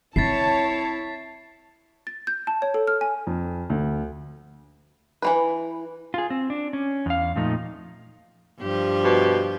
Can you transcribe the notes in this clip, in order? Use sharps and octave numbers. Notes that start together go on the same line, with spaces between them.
C4 E4 C#5 A5 A6 B6 C7
A6
G6
A5
C#5
A4
F6
G#5
F2
D2
E3 A#3 B4
F4 G#4
C4
D4
C#4
E2 F5
F2 A#2 F3 A3 D#4
G2 F3 G4
B2